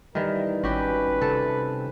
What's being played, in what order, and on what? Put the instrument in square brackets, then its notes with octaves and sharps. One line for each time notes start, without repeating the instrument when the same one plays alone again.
[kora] D#3 E3 [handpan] G3 [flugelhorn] A#4
[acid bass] G#1 [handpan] C#4 [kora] F#4 G4 [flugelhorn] B4
[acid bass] C3 [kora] A4